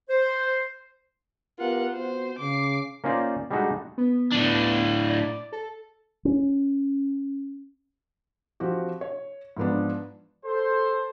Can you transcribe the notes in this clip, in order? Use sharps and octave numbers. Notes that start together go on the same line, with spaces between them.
C5
B3 F4 G4 A#4 F#5
B3 C4 F#4 C5
C#3 D6 C7
A#3 C#4 D#4 F4 C5 D5
G3 G#3 D4 D#4 F#4 A4
B3
A2 D4
D5
A4
C#4
F3 C4 F#4 G4
C#5
G#2 F3 B3 D4
A4 C5